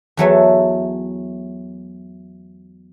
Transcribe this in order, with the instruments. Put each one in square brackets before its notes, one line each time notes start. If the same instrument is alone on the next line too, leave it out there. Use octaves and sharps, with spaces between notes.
[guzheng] E2 F#3 A3 E5